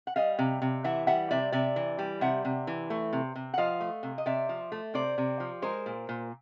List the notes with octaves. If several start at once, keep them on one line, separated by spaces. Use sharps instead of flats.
F#5
G3 D#5 F5
C3
C3
E3 E5 F#5
G3 E5 F#5
C3 D5 E5
C3 D5 E5
E3
G3
C3 E5 F#5
C3
E3
A3
C3
C3
F#5
F3 D#5 F5
A3
C3
D#5
C3 D5 E5
F3
A3
C3 C5 D5
C3
F3
G#3 A#4 C5
A#2
A#2